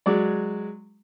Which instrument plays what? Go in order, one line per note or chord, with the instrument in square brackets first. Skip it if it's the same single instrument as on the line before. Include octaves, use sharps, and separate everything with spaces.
[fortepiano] F#3 G#3 D5